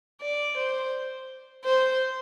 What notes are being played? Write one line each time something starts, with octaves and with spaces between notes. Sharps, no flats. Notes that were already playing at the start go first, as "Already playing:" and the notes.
D5
C5
C5